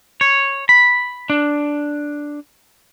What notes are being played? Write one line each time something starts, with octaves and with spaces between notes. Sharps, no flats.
C#5
B5
D4